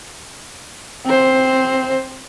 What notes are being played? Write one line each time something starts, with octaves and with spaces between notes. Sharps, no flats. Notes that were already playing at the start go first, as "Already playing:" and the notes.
C4 C5